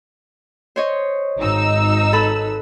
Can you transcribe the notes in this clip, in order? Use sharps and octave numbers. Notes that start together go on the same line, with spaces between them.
C5 C#5 D#5
G#1 D#4 E6
A4 B4 B5